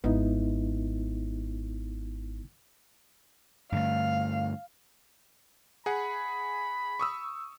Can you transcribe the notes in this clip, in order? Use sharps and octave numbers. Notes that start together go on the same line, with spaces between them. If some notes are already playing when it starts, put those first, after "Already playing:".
G#1 B3 D#4 E4
G2 D3 A3 F5
G#4 F#5 B5
C#6 D#6 E6